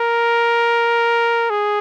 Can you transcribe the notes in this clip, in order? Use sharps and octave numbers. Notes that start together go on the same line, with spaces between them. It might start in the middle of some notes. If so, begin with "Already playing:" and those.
Already playing: A#4
G#4